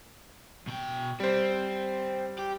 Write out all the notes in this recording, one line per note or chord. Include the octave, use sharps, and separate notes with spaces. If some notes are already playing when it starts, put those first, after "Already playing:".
B2 G5
G3 C4 C5
G4